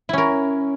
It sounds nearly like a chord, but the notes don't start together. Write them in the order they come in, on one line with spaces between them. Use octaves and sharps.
E4 C#4 A#4